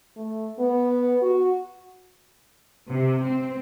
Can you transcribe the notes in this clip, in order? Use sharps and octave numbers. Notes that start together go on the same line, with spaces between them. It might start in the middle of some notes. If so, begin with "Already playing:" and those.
A3
B3
F#4
C3
C4